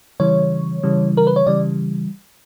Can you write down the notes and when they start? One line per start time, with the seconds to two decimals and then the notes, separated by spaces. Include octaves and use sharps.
0.20 C#3 E3 G3 C#5
0.83 C#3 E3 G3
1.17 A#4
1.27 B4
1.36 C#5
1.46 C#3 E3 G3 D5